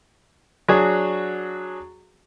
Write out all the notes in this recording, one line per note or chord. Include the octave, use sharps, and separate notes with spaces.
F#3 D4 F#4 G#4